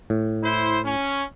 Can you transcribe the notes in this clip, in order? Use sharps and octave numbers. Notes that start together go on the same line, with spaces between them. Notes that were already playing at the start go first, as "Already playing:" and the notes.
A2
E4 C5
C#4